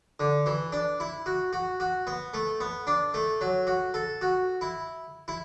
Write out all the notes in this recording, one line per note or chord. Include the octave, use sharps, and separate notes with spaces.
D3
E3
D4
E4
F#4
F#4
F#4
B3
A3
B3
D4
A3
F#3
F#4
A4
F#4
E4
E4